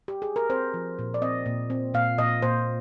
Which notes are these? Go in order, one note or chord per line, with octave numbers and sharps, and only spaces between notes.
G4
G#4
A#4
C4 C5
F3
A#2
D5
C4 D#5
A#2
C4
A#2 F5
A#2 D#5
A#2 C5